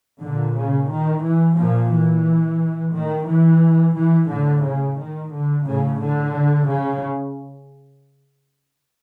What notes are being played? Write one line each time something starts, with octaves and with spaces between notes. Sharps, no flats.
A#2 D3
C#3
D#3
E3
A#2 F3
E3
A2 D#3
E3
E3
A2 D3
C#3
D#3
D3
A2 C#3
D3
C#3